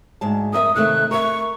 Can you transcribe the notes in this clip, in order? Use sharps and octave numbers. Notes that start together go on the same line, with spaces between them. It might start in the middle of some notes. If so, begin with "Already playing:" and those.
D2 G#2 A5
F2 A#4 E5 D#6
C3 D#3 A3 F#6
A#4 E5 C#6